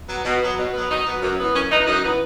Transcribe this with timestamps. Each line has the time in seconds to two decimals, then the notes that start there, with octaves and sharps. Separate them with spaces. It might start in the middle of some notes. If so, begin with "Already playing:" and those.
0.08 F#3 B3
0.25 B2
0.41 F#3 B3
0.57 B2
0.73 F#3 B3
0.90 B2 D#4
1.06 F#3 B3
1.22 F#2
1.38 E3 B3
1.54 F#2 C#4
1.70 E3 B3 D#4
1.86 F#2 D#4
2.02 E3 B3